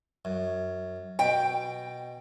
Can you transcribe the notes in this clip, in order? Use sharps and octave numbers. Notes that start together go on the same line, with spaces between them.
F#2
B2 G5